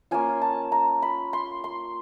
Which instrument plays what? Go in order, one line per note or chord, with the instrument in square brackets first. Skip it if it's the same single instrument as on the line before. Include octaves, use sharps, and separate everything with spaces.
[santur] A#3 C#4 F4 G#5
A5
A#5
B5
C6
C6